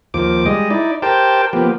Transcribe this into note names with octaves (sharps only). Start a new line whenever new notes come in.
D#2 F3 D6
G3 G#3 D#5
D#4 E4 D5
G4 A#4 C5 G5 A5
F3 A#3 B3 G4